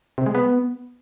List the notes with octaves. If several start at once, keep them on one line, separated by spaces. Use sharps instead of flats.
C3
G#3
B3